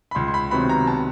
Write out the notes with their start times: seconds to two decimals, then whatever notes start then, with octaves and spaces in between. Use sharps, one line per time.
0.11 B5
0.15 C#2 C6
0.28 C6
0.34 B5
0.51 C3 D#3 F#3 B3 B5
0.69 A#5
0.87 A5